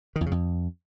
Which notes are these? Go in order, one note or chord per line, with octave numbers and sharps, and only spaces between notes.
D#3
E2
C#3
F2